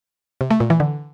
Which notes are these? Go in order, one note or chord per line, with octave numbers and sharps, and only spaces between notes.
C3
A3
A#2
E3
D3